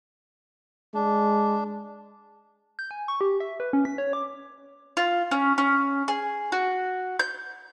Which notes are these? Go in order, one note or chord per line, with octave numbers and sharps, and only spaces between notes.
G#3 D4
G6
G#5
C#6
G4
E5
B4
C#4
B6
C#5
D6
F4
C#4
C#4
G#4
F#4
G6